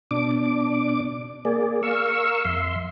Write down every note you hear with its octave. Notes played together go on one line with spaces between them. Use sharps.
B2 D4 D6
A#3 G#4 D5
A#4 F5 C#6 E6
F2 E5 C6